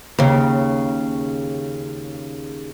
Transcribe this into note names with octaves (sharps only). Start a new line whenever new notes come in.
D#2 C#3